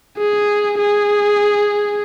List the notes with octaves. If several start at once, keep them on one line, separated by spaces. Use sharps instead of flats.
G#4
G#4